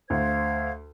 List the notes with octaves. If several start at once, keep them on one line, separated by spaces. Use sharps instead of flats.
D2 C5 F5 G#6